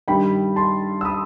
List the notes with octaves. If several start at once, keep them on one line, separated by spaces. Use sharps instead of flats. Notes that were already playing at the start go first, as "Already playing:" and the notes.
G2 D#3 G3 G5 B5
A5 C6
E6
B5 D#6